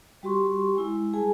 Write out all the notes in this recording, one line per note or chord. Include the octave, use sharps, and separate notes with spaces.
G3 F#4 G4 C6 C#6
G#3 E4
G3 G#4 G#5 A5